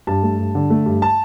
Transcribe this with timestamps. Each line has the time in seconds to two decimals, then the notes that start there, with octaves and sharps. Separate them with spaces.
0.07 G2 A5
0.23 A3
0.39 G2
0.55 D3
0.70 A3
0.86 G2
1.02 A5